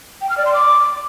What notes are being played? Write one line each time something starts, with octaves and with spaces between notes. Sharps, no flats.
G5
F6
D5
C6
D6